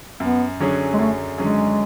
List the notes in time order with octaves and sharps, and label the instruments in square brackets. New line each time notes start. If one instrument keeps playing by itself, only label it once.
[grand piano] F#2 [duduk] B3
[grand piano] D3 F#3 C#4 G#4
[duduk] G#3
[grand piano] F#2 [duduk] A3
[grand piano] D3 F#3 C#4 G#4 [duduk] G#3